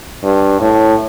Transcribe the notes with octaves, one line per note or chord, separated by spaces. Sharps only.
G2
A2